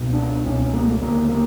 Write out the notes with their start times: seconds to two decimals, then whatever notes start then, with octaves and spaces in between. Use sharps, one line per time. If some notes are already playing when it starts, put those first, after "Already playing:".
Already playing: C#2 B2
0.13 D4
0.46 C#2 B2 C#4
0.60 C#4
0.74 A#3
0.88 A3
1.01 D2 C#3 A#3
1.28 A#3